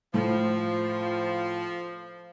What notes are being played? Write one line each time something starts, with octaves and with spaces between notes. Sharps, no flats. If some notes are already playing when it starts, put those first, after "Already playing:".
A2 F3